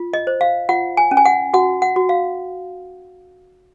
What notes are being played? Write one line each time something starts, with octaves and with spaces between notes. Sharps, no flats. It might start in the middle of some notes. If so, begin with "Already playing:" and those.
Already playing: F4
D#5
C5
F5
F4 F#5
G#5
C#4
G#5
F#5
F#4 F#5
F#5
F#4
F5